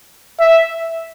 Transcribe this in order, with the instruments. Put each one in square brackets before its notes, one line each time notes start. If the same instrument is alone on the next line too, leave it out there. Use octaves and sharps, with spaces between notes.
[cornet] E5